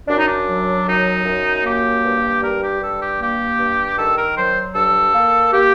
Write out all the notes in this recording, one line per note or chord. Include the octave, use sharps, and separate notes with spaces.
F#2 D4
D#4
D4
F#3
F#2 D#4
F#2
A#3 G4
G2
G3 A#4
G4
G2 A4
G4
A#3 G4
G2
D#3 A4
A#4
F#3 C5
G2 A4
A#3
A#3 G4